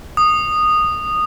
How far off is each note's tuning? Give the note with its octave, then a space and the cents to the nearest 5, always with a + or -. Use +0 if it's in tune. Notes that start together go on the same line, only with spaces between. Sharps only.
D#6 -15